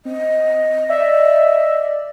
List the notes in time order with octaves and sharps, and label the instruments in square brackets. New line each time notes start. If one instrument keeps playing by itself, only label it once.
[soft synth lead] C4 [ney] D#5
[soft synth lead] D5 [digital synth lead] E5